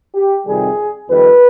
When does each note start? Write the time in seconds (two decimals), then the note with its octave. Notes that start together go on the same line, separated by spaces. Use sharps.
0.15 G4
0.46 F2 C3 D#3 G3 G#4
1.09 F2 D#3 G3 B4